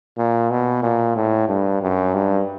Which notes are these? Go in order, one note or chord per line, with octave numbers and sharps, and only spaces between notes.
A#2
B2
A#2
A2
G2
F#2
G2